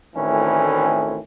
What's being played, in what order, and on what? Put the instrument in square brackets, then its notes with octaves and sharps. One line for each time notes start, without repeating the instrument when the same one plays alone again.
[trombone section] D2 A2 D#3 E3 C4 C#4